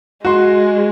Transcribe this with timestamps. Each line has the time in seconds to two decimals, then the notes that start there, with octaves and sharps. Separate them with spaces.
0.25 G#3 F#4 C6